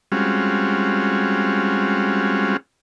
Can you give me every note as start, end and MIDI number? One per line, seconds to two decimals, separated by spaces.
0.12 2.57 55
0.12 2.57 56
0.12 2.57 60
0.12 2.57 61
0.12 2.57 65
0.12 2.57 66